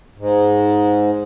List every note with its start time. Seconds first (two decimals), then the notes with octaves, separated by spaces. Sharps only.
0.18 G#2